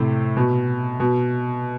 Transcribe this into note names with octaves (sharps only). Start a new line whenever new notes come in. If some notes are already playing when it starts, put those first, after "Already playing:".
Already playing: A2 C3
B2
B2